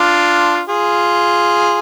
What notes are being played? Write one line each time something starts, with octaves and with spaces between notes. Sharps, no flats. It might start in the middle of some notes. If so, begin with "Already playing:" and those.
Already playing: D4 F4
F4 G#4